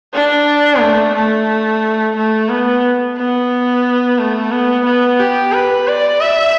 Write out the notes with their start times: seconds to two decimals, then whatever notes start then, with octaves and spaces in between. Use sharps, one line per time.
0.14 D4
0.81 A3
1.15 A3
2.16 A3
2.49 B3
3.17 B3
4.18 A3
4.52 B3
4.86 B3
5.19 G4
5.53 B4
5.88 D5
6.21 E5